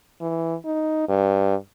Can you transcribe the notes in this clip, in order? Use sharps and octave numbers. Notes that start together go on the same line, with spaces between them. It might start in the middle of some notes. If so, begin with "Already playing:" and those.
E3
D#4
G2